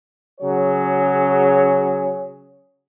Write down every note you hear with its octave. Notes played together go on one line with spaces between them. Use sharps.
C#3 F#3 G#4 C#5